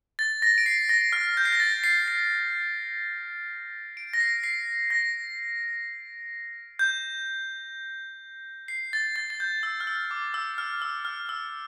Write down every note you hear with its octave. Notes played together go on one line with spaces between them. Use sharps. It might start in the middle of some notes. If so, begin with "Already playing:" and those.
A6
A#6
D7
C7
A#6
F6
G6
C7
A#6
A6
C7
C7
D7
A#6
C7
C7
A#6
G6
C7
A6
A6
A6
G6
E6
F6
E6
D6
E6
F6
E6
F6
E6